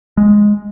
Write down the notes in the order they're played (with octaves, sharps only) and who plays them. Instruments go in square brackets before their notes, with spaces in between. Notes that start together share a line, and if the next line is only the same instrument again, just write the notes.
[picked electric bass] G#3